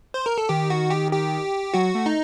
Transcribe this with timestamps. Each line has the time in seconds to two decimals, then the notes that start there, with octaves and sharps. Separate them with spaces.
0.14 C5
0.26 A#4
0.38 A4
0.49 D#3 G4
0.70 F#4
0.90 G4
1.11 G4
1.74 F#3 F#4
1.95 A3
2.06 D#4